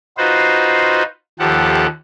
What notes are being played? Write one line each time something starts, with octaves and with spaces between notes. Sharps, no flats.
D#4 F4 F#4 B4 C5
D#2 F3 G4 A4 F#5